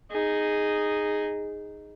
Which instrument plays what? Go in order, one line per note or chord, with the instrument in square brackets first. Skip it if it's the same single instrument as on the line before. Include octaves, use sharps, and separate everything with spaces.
[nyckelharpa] D#4 G#4